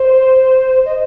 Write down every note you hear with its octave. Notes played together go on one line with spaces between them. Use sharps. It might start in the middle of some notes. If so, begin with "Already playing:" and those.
Already playing: C5
D#5